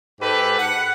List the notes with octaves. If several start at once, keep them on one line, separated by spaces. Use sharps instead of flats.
G#2 G4 A4 B4
F#5